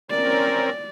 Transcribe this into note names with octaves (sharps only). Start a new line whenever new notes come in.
C4 C#4 A#4 D5